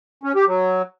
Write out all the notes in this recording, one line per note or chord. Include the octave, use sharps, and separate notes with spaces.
C#4
G4
F#3